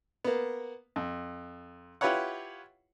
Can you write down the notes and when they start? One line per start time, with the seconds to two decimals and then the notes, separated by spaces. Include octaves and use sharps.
0.24 A#3 B3
0.96 F2
2.01 E4 F4 G4 B4 C#5 F#5